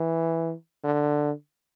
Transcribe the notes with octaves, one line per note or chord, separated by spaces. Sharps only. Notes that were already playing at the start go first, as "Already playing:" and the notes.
Already playing: E3
D3